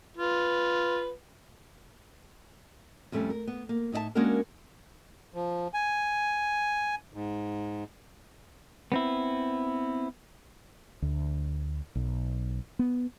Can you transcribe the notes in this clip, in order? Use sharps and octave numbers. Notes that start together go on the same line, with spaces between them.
F4 B4
F2 G3 A3 B3 C#4
A#4
B3
A#3
A2 D#4 D5 E5 A5
G#3 A#3 C#4 D4 F#4 A#4
F3
G#5
G#2
B3 C4 E4
D2
B1
B3